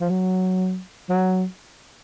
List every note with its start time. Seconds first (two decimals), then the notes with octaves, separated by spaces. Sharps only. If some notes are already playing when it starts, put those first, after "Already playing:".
0.01 F3
0.09 F#3
1.10 F#3